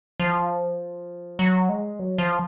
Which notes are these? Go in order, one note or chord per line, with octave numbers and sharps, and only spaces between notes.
F3
F#3
G#3
F#3
F3